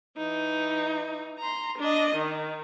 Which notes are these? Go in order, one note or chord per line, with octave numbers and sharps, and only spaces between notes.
E3 D#4
A#5 C6
D4 D#5
D#3